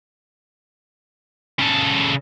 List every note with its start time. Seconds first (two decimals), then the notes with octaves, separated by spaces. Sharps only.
1.60 C#3 A4